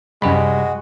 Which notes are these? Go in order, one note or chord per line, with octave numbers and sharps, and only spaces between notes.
C2 F#2 G#3 F#4 G4 B5